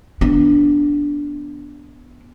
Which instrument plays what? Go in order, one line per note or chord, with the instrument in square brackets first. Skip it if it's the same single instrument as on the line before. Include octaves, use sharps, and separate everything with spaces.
[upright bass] B3 D4